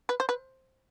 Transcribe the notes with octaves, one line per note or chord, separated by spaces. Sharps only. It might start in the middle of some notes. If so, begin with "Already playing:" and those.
B4
C5
B4